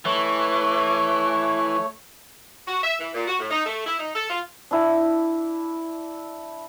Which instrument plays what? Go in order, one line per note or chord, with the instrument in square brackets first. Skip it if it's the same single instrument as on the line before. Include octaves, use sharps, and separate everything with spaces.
[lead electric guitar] E3 [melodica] A3 C#5
[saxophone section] F#4
E5
E3
A#2
F#4
A2
D#4
A3
E4
D#4
A4
F4
[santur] D4 E4 A5